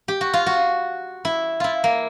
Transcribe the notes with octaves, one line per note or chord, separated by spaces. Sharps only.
G4
F#4
F4
F#4
E4
E4 F4
A#3